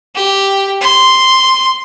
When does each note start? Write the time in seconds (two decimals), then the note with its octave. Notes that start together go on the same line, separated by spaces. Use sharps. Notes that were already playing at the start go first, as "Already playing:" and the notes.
0.15 G4
0.81 C6